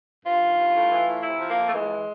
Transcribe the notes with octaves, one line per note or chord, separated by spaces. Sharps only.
G2 F4
D#3
G2
A2
E3
A2
C3 E4
F3
A#3
F2
A3
E3 G#3